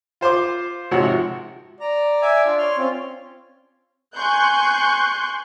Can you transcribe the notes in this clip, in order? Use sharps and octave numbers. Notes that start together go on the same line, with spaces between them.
F4 C5 C6 D6
G#1 C3 F3 F#4 C#5 F#5
D5 A#5
E5 G#5 D6
D4 F4
C#5 C6 F6
C4 C#4 F4
G#5 C6 C#6 F#6 G6